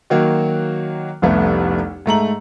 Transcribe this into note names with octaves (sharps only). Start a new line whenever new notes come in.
D#3 F#3 A#3 F#4
F1 C2 A3 B3
G#2 A3 A#5 F#7